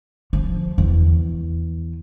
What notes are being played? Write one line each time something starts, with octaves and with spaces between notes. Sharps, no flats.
F3
E2